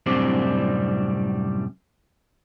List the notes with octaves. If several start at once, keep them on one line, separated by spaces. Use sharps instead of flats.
F#2 A2 C3 G3 C4 D4